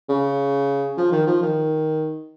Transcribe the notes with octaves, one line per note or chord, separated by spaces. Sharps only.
C#3
F3
D#3
F3
D#3